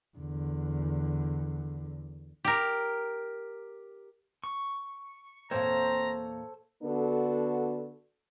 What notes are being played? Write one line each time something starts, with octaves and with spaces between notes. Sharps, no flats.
E2 D3
G4 A#4
C#6
E2 A#2 A#3 C4 A4 C5 C#5 A#5
D3 B3 D4 F#4 A4